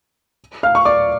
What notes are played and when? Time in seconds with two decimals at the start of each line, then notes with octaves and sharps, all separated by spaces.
0.63 F5 F6
0.75 C#6
0.85 D5 D6